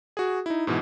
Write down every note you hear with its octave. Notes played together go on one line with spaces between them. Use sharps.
F#4 G#4
D#4 E4
G#2 B2 E3